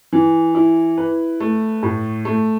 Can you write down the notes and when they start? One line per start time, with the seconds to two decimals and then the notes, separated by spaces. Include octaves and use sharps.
0.13 E3
0.55 E4
0.97 B4
1.40 A3
1.83 A2
2.25 A3